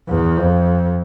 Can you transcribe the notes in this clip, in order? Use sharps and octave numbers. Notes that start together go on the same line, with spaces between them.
E2
F2